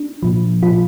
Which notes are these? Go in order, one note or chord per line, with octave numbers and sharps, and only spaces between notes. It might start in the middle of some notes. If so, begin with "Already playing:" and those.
Already playing: D4
A#2 F3
A#2 F3 F4